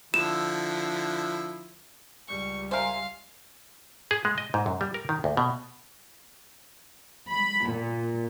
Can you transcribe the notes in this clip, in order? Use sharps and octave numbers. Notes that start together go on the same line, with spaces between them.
D3 F3 E4 E7
C#2 G3 C#6
A#4 C5 E5 F5 G#5 C6
G#4
G#3
D#5
G#2
F#2
G3
A#4
D#3
D2
B2
B5
A#2